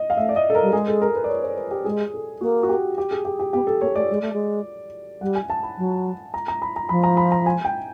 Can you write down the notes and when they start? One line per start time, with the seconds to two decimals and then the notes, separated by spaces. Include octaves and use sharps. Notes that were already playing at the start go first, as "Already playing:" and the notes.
Already playing: D#5
0.10 F5
0.17 A3 E5
0.29 D5
0.36 D#5
0.50 A4
0.55 A#4
0.62 G3
0.73 G#3 G#4
0.87 A4
1.01 A#4
1.15 B4
1.24 D5
1.29 C#5
1.43 C5
1.57 B4
1.71 G4
1.85 G#3 G#4
2.14 A4
2.41 A#3 F#4
2.63 F#4
2.69 G4
2.98 G4
3.11 G#4
3.25 G4
3.39 G4
3.53 B3 G4
3.67 A4
3.81 A#3 C#5
3.96 A3 D5
4.10 G#3
4.21 A3
4.33 G#3
5.21 G3 F#5
5.35 G#5
5.50 A5
5.63 B5
5.77 F#3
6.34 A#5
6.48 A#5
6.62 B5
6.76 A#5
6.89 F3 B5
7.04 A#5
7.17 B5
7.32 A#5
7.46 G#5
7.65 G5